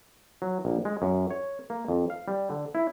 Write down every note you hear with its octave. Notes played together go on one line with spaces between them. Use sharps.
F#3
A#1
G#3
F#2
C#5
A#3
F2
F5
G3
D3
E4